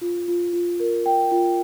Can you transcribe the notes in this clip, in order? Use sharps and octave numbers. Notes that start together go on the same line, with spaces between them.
F4
F4
F4
A#4
G5
F4